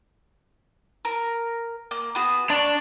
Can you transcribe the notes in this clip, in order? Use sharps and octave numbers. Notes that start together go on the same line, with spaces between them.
A#4
A#3
B3 F#4 G#4
D4 D5 C6 C#6